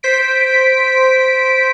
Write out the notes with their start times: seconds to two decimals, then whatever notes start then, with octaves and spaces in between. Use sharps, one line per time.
0.03 C5 B6 D7